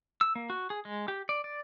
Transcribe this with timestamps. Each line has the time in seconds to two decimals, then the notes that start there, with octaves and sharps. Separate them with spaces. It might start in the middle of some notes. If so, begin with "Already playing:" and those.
0.21 E6
0.35 A#3
0.50 F#4
0.70 G#4
0.85 G#3
1.08 G4
1.29 D5
1.44 D5